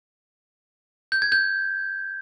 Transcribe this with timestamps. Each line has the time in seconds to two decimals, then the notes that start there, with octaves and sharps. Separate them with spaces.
1.12 G6
1.22 G#6
1.32 G6